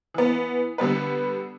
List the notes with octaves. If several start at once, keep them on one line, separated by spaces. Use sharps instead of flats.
E3 B3
D3 G3 B3 B4